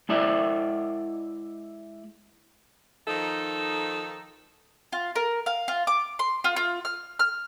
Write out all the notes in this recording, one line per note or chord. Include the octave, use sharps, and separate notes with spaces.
G#3 E4 D5 E5
D#3 F3 D#4 A4
F4
A#4
F5
F4
D6
C6
F4
F4
F6
F6